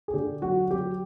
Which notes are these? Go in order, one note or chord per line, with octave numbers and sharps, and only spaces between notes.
G#4
D3 G4
F#3 F#4
F#3 G4